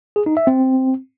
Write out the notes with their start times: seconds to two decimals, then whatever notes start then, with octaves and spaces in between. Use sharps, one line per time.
0.16 G#4
0.26 D#4
0.37 E5
0.47 C4